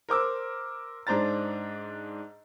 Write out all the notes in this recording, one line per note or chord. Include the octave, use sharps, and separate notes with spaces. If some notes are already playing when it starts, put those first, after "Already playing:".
A#4 C5 D6 E6
G#2 D4 C5 A#5 A6